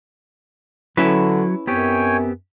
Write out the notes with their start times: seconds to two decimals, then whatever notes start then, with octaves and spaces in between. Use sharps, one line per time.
0.97 D3 F#3 C#4 E4 B4
1.67 F#2 B3 C4 G4 C#5 G5 G#5